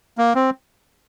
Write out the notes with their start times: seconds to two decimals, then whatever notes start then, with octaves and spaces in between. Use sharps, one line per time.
0.18 A#3
0.35 C4